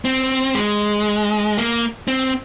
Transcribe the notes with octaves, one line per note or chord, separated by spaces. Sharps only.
C4
G#3
A#3
C4